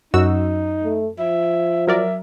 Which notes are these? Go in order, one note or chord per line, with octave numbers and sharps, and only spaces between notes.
F#2 D#4 F#4 E6
A3
F3 E5
F#3 A#4 D5 E5